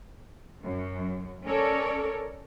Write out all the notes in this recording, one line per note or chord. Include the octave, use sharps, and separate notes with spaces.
F#2
C#4 A4 A#4 C#5 D5